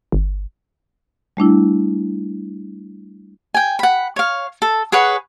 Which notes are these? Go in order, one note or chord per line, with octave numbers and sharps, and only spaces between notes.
G1
G3 A3 D4 E4
G5 G#5
F#5 B5
C#5 F5
A4
G#4 B4 C#5 F#5